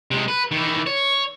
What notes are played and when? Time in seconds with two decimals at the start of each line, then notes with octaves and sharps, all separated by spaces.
0.11 C3 G#3
0.28 B4
0.51 D#3 E3
0.86 C#5